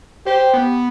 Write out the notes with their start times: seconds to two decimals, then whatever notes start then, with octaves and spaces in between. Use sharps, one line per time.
0.26 G4 C5
0.54 B3